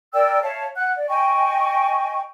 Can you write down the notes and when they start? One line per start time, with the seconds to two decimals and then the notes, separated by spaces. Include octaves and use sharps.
0.14 A#4 D5 G5 E6
0.42 C#5 E5 F5 A5
0.76 F#5 F#6
0.95 D5
1.09 D#5 G5 G#5 C#6